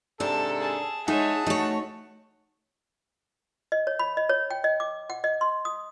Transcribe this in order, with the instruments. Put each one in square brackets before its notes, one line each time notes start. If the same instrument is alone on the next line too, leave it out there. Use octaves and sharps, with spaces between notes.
[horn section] G#2 C3 A4 [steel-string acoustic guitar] D4 A#4 [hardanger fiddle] A5
[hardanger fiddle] G#4 A5
[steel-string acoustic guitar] G#3 [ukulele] D#4 [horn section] G#4 F#5 A5 [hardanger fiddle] C#5 E5
[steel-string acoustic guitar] A3 C#5 [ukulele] D#4 [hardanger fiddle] F#4
[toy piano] D#5
C#5
B5
D#5
C#5
G5
D#5
D6
F#5
D#5
C6
D#6